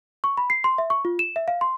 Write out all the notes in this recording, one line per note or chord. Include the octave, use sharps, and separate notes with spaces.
C#6
B5
C7
C6
E5
C#6
F4
E7
E5
F5
C6